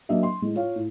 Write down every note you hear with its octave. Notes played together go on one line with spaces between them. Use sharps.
F#3 A#3 D4 D#5 E5
C6
A2 G#3
F4 C#5 F5
A2